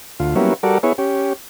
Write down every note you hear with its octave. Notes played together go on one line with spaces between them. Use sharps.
D2 F4
F#3 G3 A#3 B3 C#4 E4
G3 F#4 A4 A#4 D5
B3 E4 G#4 C#5
C#4 G4